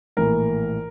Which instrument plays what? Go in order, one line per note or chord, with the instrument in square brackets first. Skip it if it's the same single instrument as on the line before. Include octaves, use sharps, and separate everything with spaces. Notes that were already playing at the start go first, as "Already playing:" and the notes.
[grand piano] A#1 A2 E3 A#4